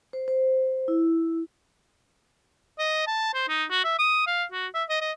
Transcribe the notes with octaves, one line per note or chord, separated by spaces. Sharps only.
C5
C5
E4
D#5
A5
C5
D#4
F#4
E5
D#6
F5
F#4
E5
D#5
D#5